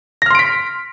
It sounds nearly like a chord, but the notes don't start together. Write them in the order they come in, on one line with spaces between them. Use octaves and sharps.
A#6 F6 C6 D7 B6